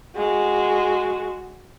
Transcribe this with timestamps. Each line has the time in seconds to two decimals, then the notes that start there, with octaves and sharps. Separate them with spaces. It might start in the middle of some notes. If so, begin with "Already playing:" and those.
0.17 G#3 F#4